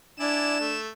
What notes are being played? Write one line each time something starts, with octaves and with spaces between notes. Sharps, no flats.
D4 E4 D5 G#5 E7
A3